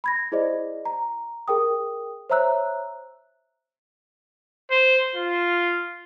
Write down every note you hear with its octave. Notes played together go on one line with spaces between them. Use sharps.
B5 G#6 A#6
E4 G#4 C5 D5 D#5
A#5
G#4 A#4 G5 D#6
C5 C#5 E5 A#5 E6 F#6
C5
F4